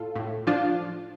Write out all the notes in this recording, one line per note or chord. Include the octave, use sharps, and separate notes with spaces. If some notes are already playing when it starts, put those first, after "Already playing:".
Already playing: A2 F4 A4
A2
F3 D4 F4